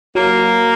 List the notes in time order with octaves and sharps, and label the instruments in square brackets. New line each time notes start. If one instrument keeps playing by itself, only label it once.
[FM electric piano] F#3 [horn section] A#3